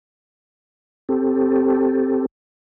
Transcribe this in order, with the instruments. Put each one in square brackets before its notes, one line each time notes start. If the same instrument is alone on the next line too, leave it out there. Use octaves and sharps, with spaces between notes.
[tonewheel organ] C4 G4 A4